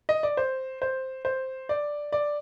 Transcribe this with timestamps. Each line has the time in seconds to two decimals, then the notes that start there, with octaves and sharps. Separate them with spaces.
0.09 D#5
0.23 D5
0.37 C5
0.82 C5
1.25 C5
1.69 D5
2.12 D5